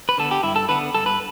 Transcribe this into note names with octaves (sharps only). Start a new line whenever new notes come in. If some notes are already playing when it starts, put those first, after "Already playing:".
B4
D3 B3 A4
G4
G2 E4
A4
D3 B3 B4
G2 A4
B4